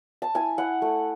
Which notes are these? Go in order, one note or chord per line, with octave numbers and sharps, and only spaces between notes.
A5
E4 G#5
E4 F#5
A3